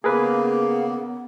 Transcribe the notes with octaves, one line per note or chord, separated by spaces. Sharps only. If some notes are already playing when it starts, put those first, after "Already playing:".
C#3 A#3 B3 G#4 A#4 B4